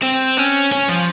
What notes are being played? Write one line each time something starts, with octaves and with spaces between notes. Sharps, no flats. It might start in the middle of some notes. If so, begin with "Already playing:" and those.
C4
C#4
C#4
F3